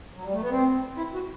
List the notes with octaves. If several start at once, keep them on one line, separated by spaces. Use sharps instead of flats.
F#3
G3
A3
B3
C4
E4
F#4